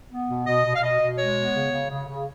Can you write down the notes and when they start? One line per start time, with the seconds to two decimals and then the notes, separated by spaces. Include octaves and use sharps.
0.11 B3
0.29 B2
0.47 B2 D#5
0.65 B2
0.75 F5
0.83 B2 D#5
1.01 B2
1.18 G#3 C#5
1.36 B3
1.55 C#3
1.72 C#3
1.90 C#3
2.08 C#3